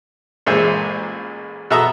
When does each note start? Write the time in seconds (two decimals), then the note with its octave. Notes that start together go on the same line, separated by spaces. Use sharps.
0.46 A1 A#2 G#3 G#4 C5 E5
1.70 B2 A4 E5 A#5 D#6 E6